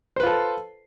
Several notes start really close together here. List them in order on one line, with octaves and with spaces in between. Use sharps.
C5 B4 F4 A4